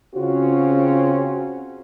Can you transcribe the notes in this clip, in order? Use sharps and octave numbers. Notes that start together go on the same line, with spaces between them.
C#3 C4 C#4 F4 F#4